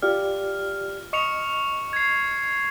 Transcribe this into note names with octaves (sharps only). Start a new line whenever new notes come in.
F4 G4 D5 F6
D#5 C#6 C#7 F7
G#6 C7